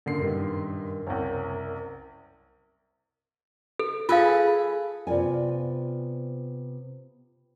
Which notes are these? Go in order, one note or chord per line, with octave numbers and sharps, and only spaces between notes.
F#2 A#2 D3 C7
G2 D#3
F#1 C2 C#4 F#5 G5
A4
F4 G#4 A4 B4 F5
C3 B3 F4 D5 G#5